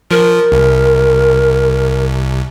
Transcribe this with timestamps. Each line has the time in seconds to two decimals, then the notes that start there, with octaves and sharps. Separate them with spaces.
0.11 F3 A#4
0.52 C2